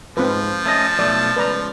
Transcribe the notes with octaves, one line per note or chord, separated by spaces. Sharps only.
G#2 F3 C4 F4 B4
A3 C#4 D#5 A5
B1 A3 D5
C#2 B4 D5 A#5